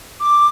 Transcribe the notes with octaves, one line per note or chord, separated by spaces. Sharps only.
D6